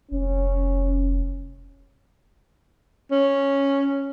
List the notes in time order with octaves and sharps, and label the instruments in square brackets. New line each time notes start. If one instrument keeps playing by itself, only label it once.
[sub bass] F1 [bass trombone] C#4
[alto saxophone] C#4